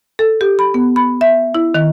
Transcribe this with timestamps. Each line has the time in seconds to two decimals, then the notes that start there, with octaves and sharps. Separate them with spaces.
0.19 A4
0.41 G4
0.59 B5
0.74 B3
0.96 B5
1.21 E5
1.55 E4
1.74 D#3